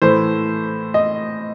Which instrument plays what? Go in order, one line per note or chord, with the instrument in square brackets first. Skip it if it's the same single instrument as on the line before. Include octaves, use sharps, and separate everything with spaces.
[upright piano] A2 E3 A3 C5
D#5